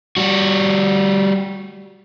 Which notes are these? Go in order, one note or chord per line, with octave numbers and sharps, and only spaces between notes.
G3 F#4